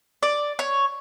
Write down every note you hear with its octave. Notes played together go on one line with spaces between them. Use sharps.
D5
C#5